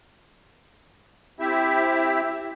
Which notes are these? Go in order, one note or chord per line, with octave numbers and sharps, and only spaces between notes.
C4 E4 G4 E5